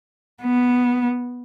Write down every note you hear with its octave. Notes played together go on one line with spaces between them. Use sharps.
B3